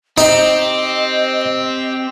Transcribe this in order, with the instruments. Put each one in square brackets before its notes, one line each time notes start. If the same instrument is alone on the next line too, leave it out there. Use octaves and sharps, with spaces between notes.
[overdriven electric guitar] C4 [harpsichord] D#4 [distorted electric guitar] G4 [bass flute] D#5